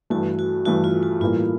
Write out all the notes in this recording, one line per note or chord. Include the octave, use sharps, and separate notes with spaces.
G2 E3 A3 F#4
F#4
G2 E3 A3 F#4
F4
F#4
A2 E3 G3 A#3 F4